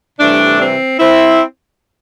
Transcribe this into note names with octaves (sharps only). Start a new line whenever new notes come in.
C3 E3 G3 A3 D4
C4
C4 E4